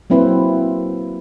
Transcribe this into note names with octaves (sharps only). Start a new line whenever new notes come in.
F#3 A#3 C4 E4 B4 C5